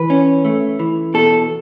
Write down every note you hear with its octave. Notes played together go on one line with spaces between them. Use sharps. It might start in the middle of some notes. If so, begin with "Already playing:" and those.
Already playing: E3 B4
C#4
A3
E3
B2 A4